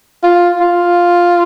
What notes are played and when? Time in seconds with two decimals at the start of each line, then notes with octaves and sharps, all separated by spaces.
0.23 F4
0.60 F4